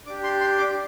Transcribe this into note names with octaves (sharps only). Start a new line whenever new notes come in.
D4 G4 D6
C6
C6
D6